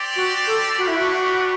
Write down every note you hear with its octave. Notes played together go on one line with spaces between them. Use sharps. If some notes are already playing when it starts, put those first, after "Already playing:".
Already playing: C4 G4 D5
F#4
A4
A3 D4 F#4 G4 B4
E4
F#4